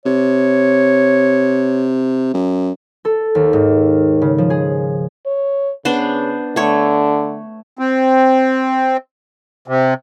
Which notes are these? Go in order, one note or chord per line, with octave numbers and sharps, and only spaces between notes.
C3 C#5
F#2
A4
D#2
G#2
C#3
F3
G#4
C#5
C#3 B3 D4 C5
D3 A3 C#5
C4
C3